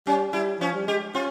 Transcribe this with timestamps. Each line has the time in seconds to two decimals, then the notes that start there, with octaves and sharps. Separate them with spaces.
0.07 G3 C#4
0.33 G3 E4
0.60 F3 C#4
0.74 G3
0.87 G#3 G4
1.15 C#4 F4